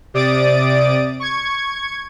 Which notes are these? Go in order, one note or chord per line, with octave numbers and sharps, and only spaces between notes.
C3 D5 D#6 A6 D7
C#6 G#6